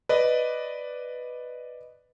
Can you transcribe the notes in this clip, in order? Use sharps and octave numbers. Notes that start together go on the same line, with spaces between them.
B4 D5 D#5